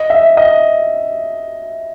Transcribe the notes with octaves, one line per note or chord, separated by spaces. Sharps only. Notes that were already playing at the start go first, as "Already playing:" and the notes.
Already playing: D#5
E5
D#5